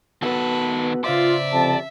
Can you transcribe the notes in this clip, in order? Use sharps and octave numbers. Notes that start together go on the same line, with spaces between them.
D#3 B3 F#4 A4 B4 A5
C#3 F4 C5 D5 E5 C6
F2 C3 A5